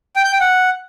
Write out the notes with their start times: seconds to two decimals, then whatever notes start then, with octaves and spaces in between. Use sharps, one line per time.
0.16 G5
0.24 G6
0.32 G5
0.41 F#5